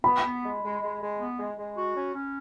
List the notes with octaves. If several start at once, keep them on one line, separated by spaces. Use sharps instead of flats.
B3 B5
B3
G#3
G#3
G#3
G#3
B3
G#3
G#3
F#4
C#4
C#4